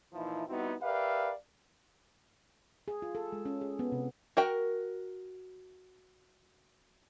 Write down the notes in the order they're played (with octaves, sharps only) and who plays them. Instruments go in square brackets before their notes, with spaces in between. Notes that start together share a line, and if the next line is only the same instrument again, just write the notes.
[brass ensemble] A#2 E3 F3 D#4 E4
G3 B3 C4 D#4 E4 F#4
G4 A#4 B4 D5 E5 F5
[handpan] G#4
F4
A4
G#3
C#4
G#4
B3
C3
[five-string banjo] F#4 A#4 G5